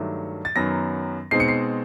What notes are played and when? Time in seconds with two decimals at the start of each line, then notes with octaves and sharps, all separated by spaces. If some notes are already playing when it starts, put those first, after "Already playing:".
Already playing: G2 D#3 F#3 A3
0.45 A6
0.56 F#2 D#3 F#3 B3 A#6
1.31 B2 G#3 C4 D#4 C7
1.40 C#7
1.48 C7